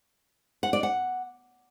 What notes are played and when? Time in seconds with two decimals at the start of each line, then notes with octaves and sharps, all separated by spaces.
0.63 F#5
0.73 D5
0.83 F#5